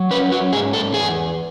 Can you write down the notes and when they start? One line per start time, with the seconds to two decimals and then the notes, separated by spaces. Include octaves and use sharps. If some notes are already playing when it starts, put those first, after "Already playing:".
Already playing: F#3
0.11 C#4 B4
0.32 F#4
0.53 G#2 G#4
0.73 A4
0.94 E2 G#4